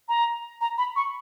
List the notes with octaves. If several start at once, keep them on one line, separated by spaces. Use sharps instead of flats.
A#5
A#5
B5
C#6